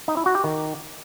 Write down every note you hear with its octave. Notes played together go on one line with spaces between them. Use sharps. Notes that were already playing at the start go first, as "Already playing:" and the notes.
D#4
E4
F#4
G4
D#3